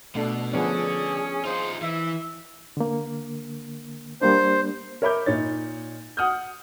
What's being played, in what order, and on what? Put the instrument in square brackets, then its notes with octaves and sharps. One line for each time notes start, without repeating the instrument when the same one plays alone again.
[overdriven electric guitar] B2 [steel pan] A3 D4 A4
[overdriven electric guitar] D3 [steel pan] F3 B3 D4 [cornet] C#4 [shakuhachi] G#4
[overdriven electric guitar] D#4 F4 [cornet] C5
[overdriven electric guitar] E3 [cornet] E5
[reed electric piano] D3 A#3
[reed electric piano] G3 A#3 D4 [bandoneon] C5
[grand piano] A#4 C#5 E5 B5 D6 G6
A#2 D#4 C#5 A6
F#5 D#6 F6 G6